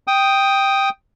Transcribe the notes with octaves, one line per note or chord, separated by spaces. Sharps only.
G5 D#6